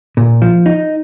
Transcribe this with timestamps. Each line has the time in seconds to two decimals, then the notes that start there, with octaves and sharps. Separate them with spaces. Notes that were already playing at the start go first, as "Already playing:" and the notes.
0.17 A#2
0.42 F3
0.66 D#4